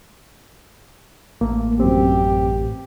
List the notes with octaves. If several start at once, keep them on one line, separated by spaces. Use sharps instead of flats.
A1 A3 A#3
F#2 C4 G4